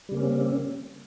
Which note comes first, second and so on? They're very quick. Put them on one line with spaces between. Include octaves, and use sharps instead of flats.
G3 C#3 A#3 C#4 C4